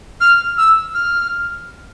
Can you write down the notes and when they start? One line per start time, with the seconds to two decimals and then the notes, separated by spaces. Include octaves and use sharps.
0.21 F6
0.57 E6
0.94 F6